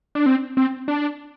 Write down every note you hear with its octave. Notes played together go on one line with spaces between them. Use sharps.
D4
C4
C4
D4